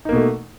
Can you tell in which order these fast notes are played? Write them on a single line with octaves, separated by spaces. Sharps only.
D#4 A#3 B2 A3